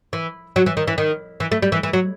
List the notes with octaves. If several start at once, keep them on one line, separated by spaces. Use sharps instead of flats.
E3
F#3
E3
D#3
E3
D#3
E3
A3
G3
E3
E3
F#3